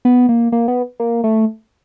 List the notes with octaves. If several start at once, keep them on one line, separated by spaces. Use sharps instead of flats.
B3
A#3
A#3
B3
A#3
A3